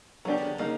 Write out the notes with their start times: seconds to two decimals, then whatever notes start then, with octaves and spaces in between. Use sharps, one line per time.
0.25 C#3 F#3 B3 D4 G4
0.38 D3 D#3
0.58 C#3 A#3 D#4